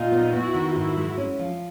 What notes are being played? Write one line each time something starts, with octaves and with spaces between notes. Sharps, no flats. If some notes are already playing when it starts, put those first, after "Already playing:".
Already playing: A#2 D#4 F4
B3
B3 E4 F#4
D#3
G#2 E4 F#4
G#3
C#4
F3